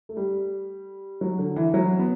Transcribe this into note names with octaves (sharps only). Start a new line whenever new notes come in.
A3
G3
F#3
D3
E3
F#3
B3